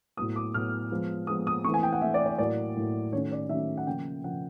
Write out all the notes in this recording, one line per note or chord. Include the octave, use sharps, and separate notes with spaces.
A2 F#3 B3 D#6
D6
A2 F#3 B3 F6
F3 G#3 B3
F3 G#3 B3 D#6
D#6
E3 A3 C4 C#6
G#5
G5
F#5
E3 A3 C4 E5
D5
D5
A2 F#3 A#3 D5
A2 F#3 A#3
D#3 F#3 A3 C#4 C#5
D5
D#3 F#3 A3 C#4 E5
F#5
C#3 F3 A#3 G5
C#3 F3 A#3 F#5